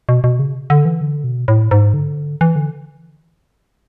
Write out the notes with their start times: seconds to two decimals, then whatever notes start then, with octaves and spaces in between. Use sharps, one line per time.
0.09 B2
0.24 B2
0.39 C#3
0.70 D3
0.85 E3
1.01 D3
1.24 B2
1.48 A2
1.71 G#2
1.94 D3
2.41 E3
2.56 D3